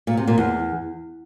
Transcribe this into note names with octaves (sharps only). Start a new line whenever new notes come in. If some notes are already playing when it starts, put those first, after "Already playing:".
A#2
C3
A#2
E2